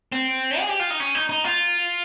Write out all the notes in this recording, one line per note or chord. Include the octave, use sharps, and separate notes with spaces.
C4
G#4
G4
F4
D#4
C#4
D#4
D#4
F4